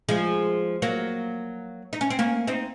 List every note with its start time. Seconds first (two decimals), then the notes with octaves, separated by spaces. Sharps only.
0.09 F3 G#3
0.82 F#3 A#3
1.93 D#4
2.01 C#4
2.10 C4
2.19 A#3 C#4
2.47 C4 D#4